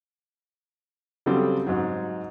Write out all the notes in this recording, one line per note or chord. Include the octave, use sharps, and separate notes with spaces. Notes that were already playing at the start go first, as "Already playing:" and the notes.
C#3 F#3 G3 C4 A4
G#2 F#3